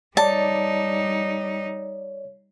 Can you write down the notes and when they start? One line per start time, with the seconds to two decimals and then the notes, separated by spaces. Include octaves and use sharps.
0.17 G3 D#4 C#5 D5 A5